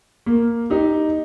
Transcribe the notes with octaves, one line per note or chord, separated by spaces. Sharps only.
A#3
D#4 G4